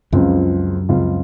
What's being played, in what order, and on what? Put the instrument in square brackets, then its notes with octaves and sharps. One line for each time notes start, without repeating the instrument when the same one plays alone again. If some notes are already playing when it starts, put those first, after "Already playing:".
[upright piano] C#2 C#3 F3 C4 F4 [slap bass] F#2
[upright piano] C#2 C#3 F3 C4 F4